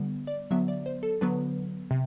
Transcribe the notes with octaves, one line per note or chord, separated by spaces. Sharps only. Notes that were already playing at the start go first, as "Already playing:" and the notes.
Already playing: D3 G3 B3
D5
D3 F#3 B3 E5
D5
C5
A4
D3 F#3 B3 B4
C3